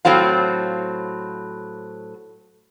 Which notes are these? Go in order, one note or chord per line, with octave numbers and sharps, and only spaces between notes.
A2 F#3 C4 F4 F5